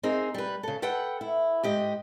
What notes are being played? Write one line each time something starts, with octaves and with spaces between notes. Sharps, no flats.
C4 D#4 G#4 A#4
G3 B4
C#3 A4
A4 B4 F#5 G5
E4
G#2 G4 D#5